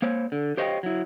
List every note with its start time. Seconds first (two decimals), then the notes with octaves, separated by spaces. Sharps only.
0.02 A#3 C5 C#5
0.32 D3
0.57 G4 C5 C#5 D#5 F5 G5
0.83 F#3 E4